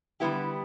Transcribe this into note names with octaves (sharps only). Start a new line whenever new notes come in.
D3 G3 B3 E4 G4